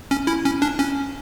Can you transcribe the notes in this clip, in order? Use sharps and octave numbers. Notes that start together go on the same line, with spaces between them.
C#4
E4
C#4
D4
C#4